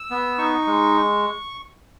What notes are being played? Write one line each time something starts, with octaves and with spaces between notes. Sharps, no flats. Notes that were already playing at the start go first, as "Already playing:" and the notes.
Already playing: E6
B3
D#4 C#6
G#3